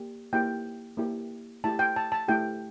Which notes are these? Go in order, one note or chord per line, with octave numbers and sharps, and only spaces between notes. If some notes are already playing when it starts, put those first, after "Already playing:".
Already playing: A#3 G4
A#3 E4 G4 G5
A#3 E4 G4
A3 E4 G4 A5
G5
A5
A5
A3 E4 G4 G5